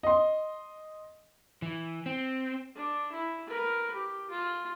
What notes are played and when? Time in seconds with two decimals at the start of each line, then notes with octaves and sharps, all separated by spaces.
0.03 D#5 C6
1.62 E3
2.06 C4
2.75 D4
3.12 E4
3.47 A#4 B4
3.94 G4
4.30 F4